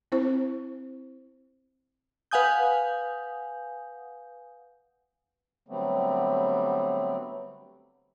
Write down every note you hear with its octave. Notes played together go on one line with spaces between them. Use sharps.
C4 E4 C5
B4 F5 F#5 G#5 D#6 G6
D3 F#3 G3 A3 B3 C4